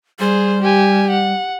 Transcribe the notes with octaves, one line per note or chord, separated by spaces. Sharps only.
G3 G#4 C5
G4 G#5
F#5